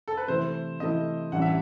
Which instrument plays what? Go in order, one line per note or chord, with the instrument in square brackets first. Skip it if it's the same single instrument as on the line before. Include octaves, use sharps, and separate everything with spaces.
[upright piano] A4
B4
[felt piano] C3 E3 A3 E4 [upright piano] C5
[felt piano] C3 E3 A3 E4 [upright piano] D#5
[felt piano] A1 G2 E3 [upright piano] F#5
[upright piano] E5